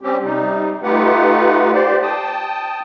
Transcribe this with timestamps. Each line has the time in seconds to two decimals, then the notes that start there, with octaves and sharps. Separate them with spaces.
0.01 G3 C4 C#4 G4
0.23 C3 G3 D#4
0.83 A3 D#4 F4 G4 B4 F#5
1.73 G4 C5 D5
2.02 G5 A5 D#6